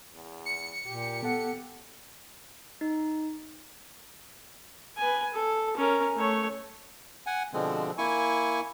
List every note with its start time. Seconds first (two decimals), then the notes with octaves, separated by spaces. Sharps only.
0.14 E2
0.46 C#7
0.86 A#2 G4
1.23 B3 A4 F#5
2.81 D#4
4.97 B4 G#5
5.34 A4
5.77 C#4 A#4
6.16 A3 C#5
7.26 F#5 G#5
7.53 B2 D3 F3 G#3 C4
7.98 A#3 E4 G#5 C#6